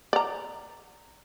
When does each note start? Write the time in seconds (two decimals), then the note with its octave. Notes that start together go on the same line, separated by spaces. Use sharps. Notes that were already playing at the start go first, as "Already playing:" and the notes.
0.13 D5 A#5